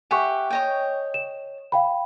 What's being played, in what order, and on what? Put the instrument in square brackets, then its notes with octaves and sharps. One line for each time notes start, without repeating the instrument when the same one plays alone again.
[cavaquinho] G4 E5 F#5 [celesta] G#5 C#6
[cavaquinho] C#5 D#5 G5
[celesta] E7
F5 G5 B5